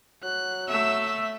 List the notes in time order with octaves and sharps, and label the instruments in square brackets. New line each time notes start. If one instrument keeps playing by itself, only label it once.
[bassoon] F#3 [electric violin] F#6
[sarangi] A3 [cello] E5 [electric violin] E6